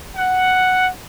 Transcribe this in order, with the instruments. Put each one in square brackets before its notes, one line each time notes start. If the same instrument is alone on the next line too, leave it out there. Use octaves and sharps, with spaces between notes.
[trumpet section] F#5